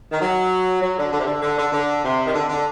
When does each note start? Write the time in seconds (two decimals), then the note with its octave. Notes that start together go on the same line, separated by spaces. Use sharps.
0.11 D#3
0.21 F#3
0.81 F#3
0.97 D3
1.12 D3
1.19 C3
1.26 D3
1.42 D3
1.58 D3
1.72 D3
2.03 C3
2.26 D#3
2.33 D3
2.49 D3